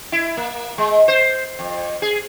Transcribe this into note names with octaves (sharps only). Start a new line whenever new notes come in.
E4
A#3
G#3
C5
F2
G#4